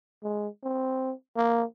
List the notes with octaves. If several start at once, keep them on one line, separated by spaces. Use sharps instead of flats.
G#3
C4
A#3